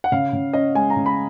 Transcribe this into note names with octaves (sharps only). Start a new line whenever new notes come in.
F#5
C#3 F5
C#3
C#4 D#5
G#3 G#5
A#5
C#3
B5